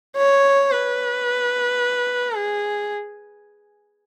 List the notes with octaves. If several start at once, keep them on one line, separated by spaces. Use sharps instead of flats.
C#5
B4
G#4